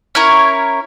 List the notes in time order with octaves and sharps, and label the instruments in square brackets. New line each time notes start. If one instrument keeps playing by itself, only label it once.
[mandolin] C#4 E4 A#4 C#5